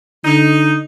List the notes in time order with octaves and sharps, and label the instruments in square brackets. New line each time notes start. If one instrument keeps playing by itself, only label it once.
[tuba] D3 [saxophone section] D#4